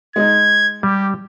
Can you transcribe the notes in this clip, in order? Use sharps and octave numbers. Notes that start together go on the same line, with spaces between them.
G#3 D#4 G#6
G3 G4